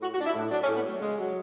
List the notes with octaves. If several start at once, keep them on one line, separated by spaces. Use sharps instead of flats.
A2 F#4
F#4
A2 D4
E4
A2 D4
F#3 D4
C#4
A2
B3
F#3 A3
C#3 G#3
F#3